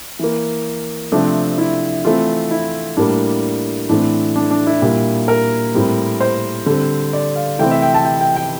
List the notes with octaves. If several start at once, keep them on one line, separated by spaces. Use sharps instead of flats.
E3 A#3
C3 F3 A3 C4 D4
E4
E3 A3 C4 F4
E4
A2 G3 A#3 D4
A2 E3 A3 C4 D4
D4
D4
E4
A#2 G3 A#3
A#4
A2 G3 C4
C5
D3 G3 C4
D5
F5
C3 E3 A3 C4 G5
E5
G5
A5
G5
G5
G5